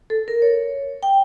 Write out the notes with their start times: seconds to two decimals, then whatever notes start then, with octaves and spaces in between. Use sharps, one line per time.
0.10 A4
0.28 A#4
0.42 C#5
1.03 G5